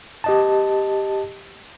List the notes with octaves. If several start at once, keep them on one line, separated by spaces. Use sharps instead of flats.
G4 D#5 A5